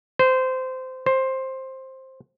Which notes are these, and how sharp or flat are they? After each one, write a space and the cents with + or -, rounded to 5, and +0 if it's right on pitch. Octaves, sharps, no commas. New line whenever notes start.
C5 -20
C5 +10